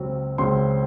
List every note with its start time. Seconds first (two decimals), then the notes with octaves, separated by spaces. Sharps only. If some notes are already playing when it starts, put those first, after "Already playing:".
Already playing: C#2 C#3 F#3 C4
0.38 C#2 C#3 F#3 C4 C6